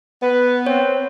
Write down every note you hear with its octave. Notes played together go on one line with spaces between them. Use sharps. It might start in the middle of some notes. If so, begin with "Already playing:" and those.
B3 B4
C4 C#5